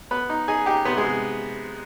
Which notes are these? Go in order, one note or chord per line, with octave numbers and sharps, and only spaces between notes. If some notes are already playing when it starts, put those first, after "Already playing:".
B3 B4 B5
D#4
D#4 G#4 G#5
D#4 G4 G5
C3 B3 B4
G#3 G#4
C3